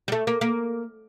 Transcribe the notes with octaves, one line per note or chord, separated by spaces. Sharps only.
G3
A3
A#3
A#3